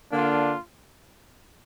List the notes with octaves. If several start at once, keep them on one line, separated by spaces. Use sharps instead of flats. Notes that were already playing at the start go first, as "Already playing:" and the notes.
D3 A#3 D4 F4